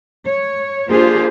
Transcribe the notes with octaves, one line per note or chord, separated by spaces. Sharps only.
C#5
A#3 D4 F4 G4 G#4 C5